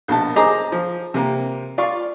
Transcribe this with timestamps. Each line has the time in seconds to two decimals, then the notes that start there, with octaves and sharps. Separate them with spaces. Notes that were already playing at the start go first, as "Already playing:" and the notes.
0.08 A#1 B2 A5
0.36 G#4 C5 D#5 A#5 D6
0.72 F3
1.14 C3 A#3
1.78 F4 D5 F5 C#6